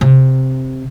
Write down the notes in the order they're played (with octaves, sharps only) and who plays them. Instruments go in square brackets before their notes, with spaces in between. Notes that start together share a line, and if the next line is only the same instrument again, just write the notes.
[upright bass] C3